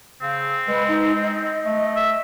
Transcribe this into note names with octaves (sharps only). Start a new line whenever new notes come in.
C#3 C4
G#3 B4
D#4
D#5
A3
E5